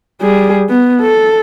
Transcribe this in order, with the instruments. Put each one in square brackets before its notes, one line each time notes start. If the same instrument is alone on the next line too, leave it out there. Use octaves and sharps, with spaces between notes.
[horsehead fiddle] G3 G#4
B3
A4